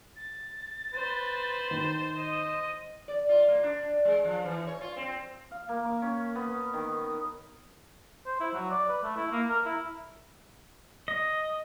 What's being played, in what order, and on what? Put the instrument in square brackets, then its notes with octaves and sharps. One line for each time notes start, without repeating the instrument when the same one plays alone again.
[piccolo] A6
[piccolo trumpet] B4 [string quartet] C5
[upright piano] D#3
[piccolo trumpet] D#5 [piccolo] D#7
[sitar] D5
F4
A#3
D4
G#3
F3
E3
C#5
F4
C4
[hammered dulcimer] F5
A#3
D6
C#4
B3
D#3
D#5
[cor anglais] C5
E4
F#3
D5
B4
A3
E4
A#3
A#4
E4
[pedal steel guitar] D#5